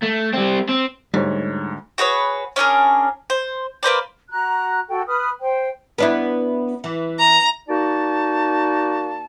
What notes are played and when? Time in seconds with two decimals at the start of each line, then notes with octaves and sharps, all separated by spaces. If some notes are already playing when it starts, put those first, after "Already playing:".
0.02 A3
0.33 G3 C4
0.69 C4
1.14 D2 G#2 G3 C#5
1.98 F#4 G#4 B4 C#5
2.56 C#4 D4 G#4 A#4
3.30 C5
3.83 A#3 B4 C5 D5
4.30 F#4 A#5 F#6
4.89 F#4 A4 G5
5.08 B4 D#6 F6
5.41 C5 G5
5.98 B3 D4 E4
6.84 E3
7.19 A#5
7.69 A#3 D#4 F#4 D5 A5